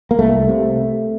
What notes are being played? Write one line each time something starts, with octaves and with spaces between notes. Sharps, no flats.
A#3
C2 A3
C3